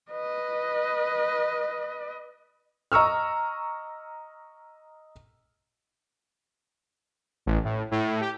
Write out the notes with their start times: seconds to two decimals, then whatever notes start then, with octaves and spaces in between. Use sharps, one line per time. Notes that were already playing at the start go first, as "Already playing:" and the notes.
0.11 B4 D#5
2.92 D#5 A#5 C#6 E6 F6
7.46 A1
7.64 A2
7.91 A2
8.21 G4